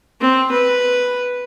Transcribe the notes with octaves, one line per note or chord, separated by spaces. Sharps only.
C4
B4